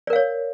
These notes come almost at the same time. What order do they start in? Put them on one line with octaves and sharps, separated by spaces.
D5 A#4 F5 C#5